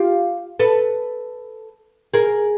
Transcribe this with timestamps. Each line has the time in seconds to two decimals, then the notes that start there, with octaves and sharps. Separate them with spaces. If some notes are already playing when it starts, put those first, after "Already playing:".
Already playing: F4 G4
0.59 A4 B4
2.14 G#4 A#4